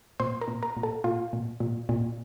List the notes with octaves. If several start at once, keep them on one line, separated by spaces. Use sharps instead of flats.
A#2 C5
A#4
A#2
A#4
A#2
A4
A#2 F4
A#2
A#2
A#2